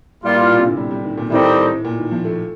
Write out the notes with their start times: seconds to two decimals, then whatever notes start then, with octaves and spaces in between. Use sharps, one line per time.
0.23 A2 G3 A#3 F4
0.37 A2
0.51 A#2
0.58 C3
0.64 D3
0.77 G3
0.91 G3
1.04 D#3
1.18 A#2
1.30 A2 D#3 G3 C4 D#4 A4
1.85 A#2
1.98 D#3
2.11 F3
2.25 A3